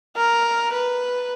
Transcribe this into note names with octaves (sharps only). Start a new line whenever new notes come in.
A#4
B4